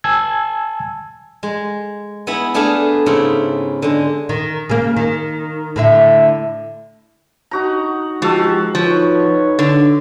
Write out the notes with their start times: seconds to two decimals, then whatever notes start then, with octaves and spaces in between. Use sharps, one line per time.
0.04 G#5 A5 E6 G#6
1.43 G#3
2.27 B3 E4 G#4 B5
2.54 A3 D4 G#4 A4 E5 F5
3.06 G#2 C#3 E4
3.82 D3 G#3
4.29 D#3
4.69 C#3 A#3
4.96 D#3
5.76 A2 D3 E5
7.51 D#4 F#4 A#5
8.22 F3 G#3 F#4 G4 A4
8.75 F3 D#4 B4 C#5
9.59 D3